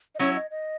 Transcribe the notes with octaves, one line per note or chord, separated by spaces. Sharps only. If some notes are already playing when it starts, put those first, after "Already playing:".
D#5
F#3 C#4 E4 C#5
D#5
D#5